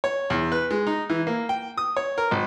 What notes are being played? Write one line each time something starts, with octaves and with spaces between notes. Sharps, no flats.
C#5
E2
B4
G#3
D#4
E3
A#3
G5
D#6
C#5
A#4
G#1